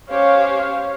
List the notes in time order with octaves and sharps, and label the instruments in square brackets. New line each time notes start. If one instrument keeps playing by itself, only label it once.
[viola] C#4 F5 [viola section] G4 C5 C#5